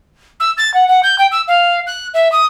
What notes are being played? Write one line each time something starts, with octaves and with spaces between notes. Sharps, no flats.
E6
A6
F#5
F#5
G6
G5
E6
F5
F#6
E5
D#6